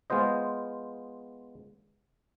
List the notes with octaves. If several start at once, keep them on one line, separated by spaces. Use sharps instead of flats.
G#3 B3 F4 C5 D#5